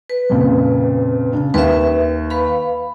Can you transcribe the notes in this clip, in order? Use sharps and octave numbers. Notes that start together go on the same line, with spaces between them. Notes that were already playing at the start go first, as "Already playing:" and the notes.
B4
F2 A#2 C#3
C#3 D4
D#2 B4 E5
B4 F5 B5